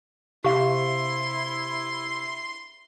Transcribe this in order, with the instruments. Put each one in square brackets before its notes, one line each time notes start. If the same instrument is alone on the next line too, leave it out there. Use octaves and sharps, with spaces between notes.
[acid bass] C3 [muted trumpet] E4 [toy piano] G4 F5 [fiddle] C6